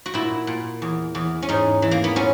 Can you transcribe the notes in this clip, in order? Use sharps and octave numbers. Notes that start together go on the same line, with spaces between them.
F#4
A#2 E4
A#2
E2
E2
C#4
G#2 D#4
E3
A#3
B3
A#2 C#4